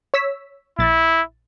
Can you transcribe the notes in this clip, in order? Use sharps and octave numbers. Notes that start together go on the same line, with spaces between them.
C#5 E6 B6
A#1 E4 A6